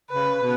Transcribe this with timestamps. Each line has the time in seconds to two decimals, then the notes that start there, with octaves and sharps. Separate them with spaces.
0.10 C#3 B4
0.39 B2